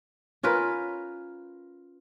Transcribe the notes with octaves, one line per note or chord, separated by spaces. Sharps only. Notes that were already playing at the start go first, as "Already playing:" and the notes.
C#4 F4 A#4 B4